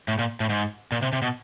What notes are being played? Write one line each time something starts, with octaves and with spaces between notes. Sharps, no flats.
A2
A#2
A2
G#2
A#2
C3
C3
B2